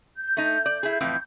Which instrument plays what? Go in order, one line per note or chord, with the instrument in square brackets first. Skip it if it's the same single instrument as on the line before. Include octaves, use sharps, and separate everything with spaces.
[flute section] G6
[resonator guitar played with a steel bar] A3 D#4
D5
E4 G#4
F2 A2 E3